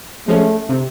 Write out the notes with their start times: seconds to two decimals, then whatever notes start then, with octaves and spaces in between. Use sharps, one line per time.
0.27 F3 G#3 A3 C#4
0.69 C3